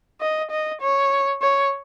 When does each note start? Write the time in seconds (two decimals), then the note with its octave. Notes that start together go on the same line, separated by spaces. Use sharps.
0.21 D#5
0.51 D#5
0.81 C#5
1.42 C#5